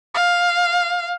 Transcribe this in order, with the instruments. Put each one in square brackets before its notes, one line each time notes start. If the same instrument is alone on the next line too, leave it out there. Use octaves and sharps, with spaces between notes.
[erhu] F5